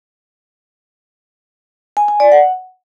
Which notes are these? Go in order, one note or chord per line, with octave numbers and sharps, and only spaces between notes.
G#5
G#5
D5
F#5